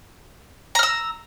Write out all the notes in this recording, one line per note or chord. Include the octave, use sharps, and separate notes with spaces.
A#5 E6 F6